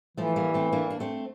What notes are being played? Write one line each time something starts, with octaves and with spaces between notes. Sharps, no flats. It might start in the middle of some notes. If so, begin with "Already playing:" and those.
E3 F3 A3
G3 A#3
A3 C4
A#3 D4
D4
A3 C4